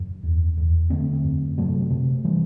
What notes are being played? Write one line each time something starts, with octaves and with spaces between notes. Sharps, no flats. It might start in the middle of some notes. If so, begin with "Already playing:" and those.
Already playing: F#2
E2
E2
D3 A3 C4
F#2
C3 F#3 A3
C3
E3 G3